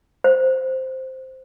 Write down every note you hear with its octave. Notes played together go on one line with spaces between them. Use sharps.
C5